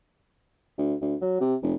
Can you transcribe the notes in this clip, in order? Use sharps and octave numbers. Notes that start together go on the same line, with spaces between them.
D2
D2
F#3
C3
F1